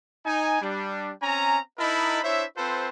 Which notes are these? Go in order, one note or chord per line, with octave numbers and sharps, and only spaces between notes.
D#4 G#5
G3 D4
C4 C#4 G#5 A#5
D#4 E4 A#4 D#5 A5 B5
D4 E4 C5 C#5 E5
C4 F4 A4 B4 C5